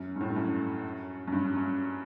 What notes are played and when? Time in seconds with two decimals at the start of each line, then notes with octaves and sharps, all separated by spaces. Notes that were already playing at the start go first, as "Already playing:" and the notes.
Already playing: F#2
0.16 G2
0.21 A2
0.30 G2
0.36 F#2
1.28 F#2
1.32 G2
1.56 F#2